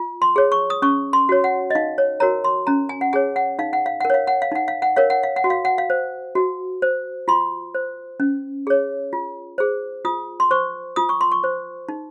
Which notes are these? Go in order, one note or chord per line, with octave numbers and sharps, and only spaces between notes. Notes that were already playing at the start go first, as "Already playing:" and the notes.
Already playing: F4
C6
G#4 C#5
C#6
D#6
C#4 C#6
C6
F#4 C#5
F#5
D#5
D#4 F5
C#5
F#4 A#4 C#5 A#5
C6
C#4 A#5
G#5
F#5
G#4 C#5 G#5
F#5
D#4 F5
F#5
F5
A#4 F#5
C#5 F5
F#5
F5
D#4 F#5
F5
F#5
A#4 C#5 F5
F#5
F5
F#5
F#4
F5
F#5
F5
C5
F#4
C5
F4 C6
C5
C#4
G#4 C#5
F4
G#4 C5
F4 D#6
C6
C5 C#6
F4 D#6
C#6
C6
C#6
C5
D#4